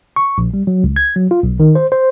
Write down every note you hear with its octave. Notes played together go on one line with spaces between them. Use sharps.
C#6
A#1
G3
F#3
C#2
G#6
F#3
F4
B1
D#3
C5
C5